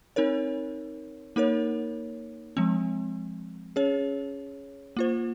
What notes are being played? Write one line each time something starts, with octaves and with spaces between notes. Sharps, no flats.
C4 D#4 A#4 C#5
A#3 D#4 A#4 C#5
F3 G#3 C4
C#4 G#4 C#5
A#3 F4 C5